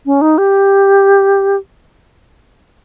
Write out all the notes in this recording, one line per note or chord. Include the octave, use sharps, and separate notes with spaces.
C#4
D#4
G4